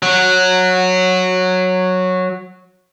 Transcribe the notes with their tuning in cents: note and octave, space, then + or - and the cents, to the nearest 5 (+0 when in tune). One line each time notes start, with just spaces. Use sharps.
F#3 -10